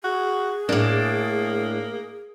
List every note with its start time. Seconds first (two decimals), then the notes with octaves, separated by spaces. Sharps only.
0.04 F#4 G#4
0.69 A2 A#3 D4